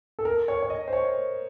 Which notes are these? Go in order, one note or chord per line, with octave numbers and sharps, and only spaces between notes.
A4
A#4
C#5
C#5
D#5
C5
C#5